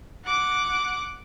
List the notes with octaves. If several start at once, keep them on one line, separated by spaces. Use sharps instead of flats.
F#5 D6